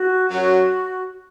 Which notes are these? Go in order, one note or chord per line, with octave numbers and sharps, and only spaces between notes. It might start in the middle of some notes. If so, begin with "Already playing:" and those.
Already playing: F#4
F#2 F#3 F#4